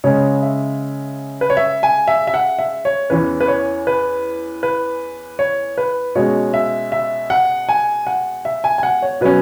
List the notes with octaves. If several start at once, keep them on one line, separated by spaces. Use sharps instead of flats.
C#3 G#3 C#4 C#5
E5
B4
C#5
E5
G#5
E5
E5
F#5
E5
C#5
E2 E3 C#4 B4
B4
C#5
B4
B4
C#5
B4
B2 G#3 C#4 C#5
E5
E5
F#5
G#5
F#5
E5
G#5
G#5
F#5
C#5
B2 F#3 C#4 B4